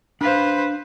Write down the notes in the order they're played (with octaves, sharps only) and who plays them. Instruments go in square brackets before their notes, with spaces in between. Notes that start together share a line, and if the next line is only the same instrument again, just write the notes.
[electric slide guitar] D4 F5 [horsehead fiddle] B4 C5